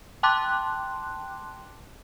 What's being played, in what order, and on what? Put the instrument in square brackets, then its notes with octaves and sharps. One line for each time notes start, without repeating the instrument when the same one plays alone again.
[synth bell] G5 A5 C6 D6 F#6